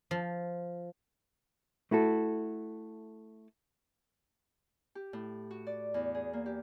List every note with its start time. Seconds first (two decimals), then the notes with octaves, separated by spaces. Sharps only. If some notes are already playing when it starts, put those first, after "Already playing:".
0.11 F3
1.91 A3 E4 F#4 A4
4.95 G4
5.13 A2
5.51 F#4
5.67 D5
5.94 E2
6.15 G#4
6.33 A#3
6.46 G4